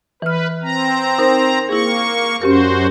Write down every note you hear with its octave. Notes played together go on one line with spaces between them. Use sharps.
E3 B4 F6
C4 A#5
D#4 A#4 C5
A#3 E4 G#4 C#6
F#2 C#4 F#4 G4 A#4 C5